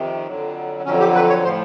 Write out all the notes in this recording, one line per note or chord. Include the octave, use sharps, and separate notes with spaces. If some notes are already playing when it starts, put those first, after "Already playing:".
Already playing: F2 C3 D#3
F2 D3 F#3
F2 D3 F#3 C#4
G4
B4
C#5
A2 F3 C5